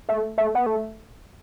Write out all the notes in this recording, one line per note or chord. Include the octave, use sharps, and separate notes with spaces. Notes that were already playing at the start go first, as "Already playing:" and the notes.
A3
A3
B3
A3